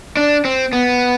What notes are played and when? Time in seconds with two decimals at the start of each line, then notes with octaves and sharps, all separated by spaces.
0.17 D4
0.45 C4
0.73 B3